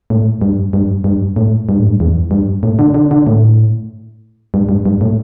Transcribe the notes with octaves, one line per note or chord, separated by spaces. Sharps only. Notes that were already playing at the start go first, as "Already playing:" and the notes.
A2
G2
G2
G2
A2
G2
A2
G2
E2
G2
A2
D3
D3
D3
A2
G2
G2
G2
A2